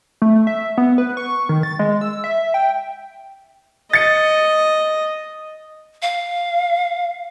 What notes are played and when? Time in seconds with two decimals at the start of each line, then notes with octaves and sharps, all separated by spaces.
0.22 A3
0.47 E5
0.78 B3
0.98 B4
1.17 C#6
1.49 D#3
1.63 A6
1.79 G#3
2.01 E6
2.24 E5
2.54 G5
3.93 D#5 A6 C#7
6.02 F5